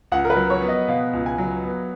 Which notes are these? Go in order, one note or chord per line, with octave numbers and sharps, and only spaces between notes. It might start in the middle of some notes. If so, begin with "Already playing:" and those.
C#2 F#5
A#4
B4
F#3
C#5
B3
D#5
B2 F5
C#2
G#5
F#3
B3